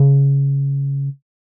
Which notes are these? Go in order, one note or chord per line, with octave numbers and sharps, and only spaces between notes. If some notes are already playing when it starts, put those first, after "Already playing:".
Already playing: C#3